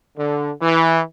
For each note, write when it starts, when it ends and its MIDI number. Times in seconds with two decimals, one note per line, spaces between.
0.18 0.50 50
0.61 0.99 52